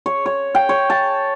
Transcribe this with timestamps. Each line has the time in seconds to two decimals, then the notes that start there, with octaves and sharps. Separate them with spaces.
0.06 C#5
0.26 C#5
0.55 G5
0.69 C#5
0.90 A5